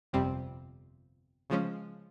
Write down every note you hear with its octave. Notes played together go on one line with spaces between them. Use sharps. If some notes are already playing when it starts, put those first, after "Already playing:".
G1 F2 C3 G3 C4
C#3 F3 G#3 C#4